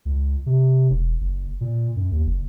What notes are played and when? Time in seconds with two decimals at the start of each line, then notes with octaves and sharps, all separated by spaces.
0.05 C#2
0.46 C3
0.90 E1
1.21 F#1
1.61 A#2
1.96 F#2
2.12 D#2
2.26 F#1